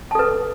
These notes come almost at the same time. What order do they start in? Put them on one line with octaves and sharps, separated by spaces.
A5 A4 B4